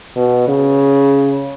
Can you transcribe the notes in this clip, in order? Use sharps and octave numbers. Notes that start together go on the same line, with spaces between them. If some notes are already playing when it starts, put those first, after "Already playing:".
B2
C#3